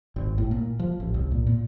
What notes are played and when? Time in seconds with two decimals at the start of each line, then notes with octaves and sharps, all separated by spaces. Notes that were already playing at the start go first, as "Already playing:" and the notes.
0.16 G#1
0.38 A2
0.51 A#2
0.79 F3
1.00 A1
1.14 C2
1.32 A#2
1.47 A#2